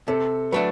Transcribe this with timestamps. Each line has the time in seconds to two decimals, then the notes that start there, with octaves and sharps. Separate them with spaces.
0.08 C3 A4
0.52 F#3 A3 D4 B4